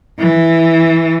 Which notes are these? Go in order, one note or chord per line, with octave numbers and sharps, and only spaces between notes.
E3